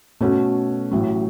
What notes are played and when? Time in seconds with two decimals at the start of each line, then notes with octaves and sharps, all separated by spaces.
0.20 B2 A3 C#4 F#4 A4
0.91 A1 A2 F#3